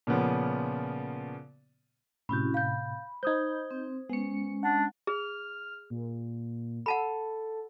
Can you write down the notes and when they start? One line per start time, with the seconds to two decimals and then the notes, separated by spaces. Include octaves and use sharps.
0.07 A#2 C#3 F3 B3 C#4
2.29 A2 C3 C#4 E4 F#4 B5 G6
2.54 F5 B5 G6
3.23 D#4 C5 D#6 G6 G#6
3.71 C4
4.09 G#3 B3 C#4 C#7
4.63 D4 F#5
5.07 G#4 F6
5.90 A#2
6.86 A4 F#5 A5 B5